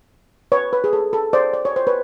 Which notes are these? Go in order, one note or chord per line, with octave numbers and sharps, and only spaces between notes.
B4 C#5
B4
G#4
A4
A4
C5 D5
D5
C#5
C5
B4 C#5